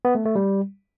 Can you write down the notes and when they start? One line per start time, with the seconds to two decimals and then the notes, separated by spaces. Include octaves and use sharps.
0.05 B3
0.15 A3
0.25 A3
0.35 G3